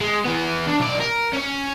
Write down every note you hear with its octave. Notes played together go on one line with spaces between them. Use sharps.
G#3
E3 B3
D4
B1 D5
A#4
C#4 C#5